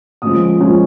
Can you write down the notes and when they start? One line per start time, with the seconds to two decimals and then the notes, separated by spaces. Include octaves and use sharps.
0.22 A#2 F3 G#3 C#4 D#6
0.60 A#2 F3 G#3 C#4